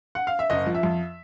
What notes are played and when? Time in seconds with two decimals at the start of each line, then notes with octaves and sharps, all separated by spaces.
0.15 F#5
0.27 F5
0.39 E5
0.50 F#1 D#5
0.66 F3
0.74 E5
0.83 F2